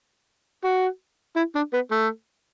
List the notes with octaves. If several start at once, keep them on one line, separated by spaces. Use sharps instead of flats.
F#4
E4
D4
B3
A3